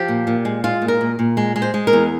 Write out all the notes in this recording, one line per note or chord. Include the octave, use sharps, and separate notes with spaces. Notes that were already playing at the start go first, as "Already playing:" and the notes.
Already playing: F3 G4
A#2
A#2
G#3
G#3 F4
A#2
A#4
A#2
A#2
G#3
G#3
C5
G#3
A#4
E2